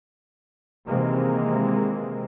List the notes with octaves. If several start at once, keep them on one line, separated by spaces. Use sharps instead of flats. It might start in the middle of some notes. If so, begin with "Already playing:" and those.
C3 D#3 E3 G#3 A#3 C4